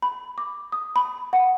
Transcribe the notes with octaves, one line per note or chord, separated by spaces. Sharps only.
B5
D6
D#6
B5
F#5